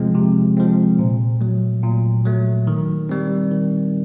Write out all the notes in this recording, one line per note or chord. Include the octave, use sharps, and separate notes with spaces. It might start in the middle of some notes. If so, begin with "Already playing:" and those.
Already playing: C3 F3 G#3 C4
C3
F3 G#3 C4
A#2
F#3 A3
A#2
F#3 A3
D#3
G3 C4
D#3